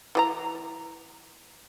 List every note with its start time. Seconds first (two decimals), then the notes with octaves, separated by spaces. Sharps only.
0.15 E3 G#4 A#5